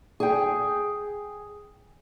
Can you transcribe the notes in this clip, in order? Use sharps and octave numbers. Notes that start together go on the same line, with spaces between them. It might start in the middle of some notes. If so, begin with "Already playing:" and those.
G#4 G5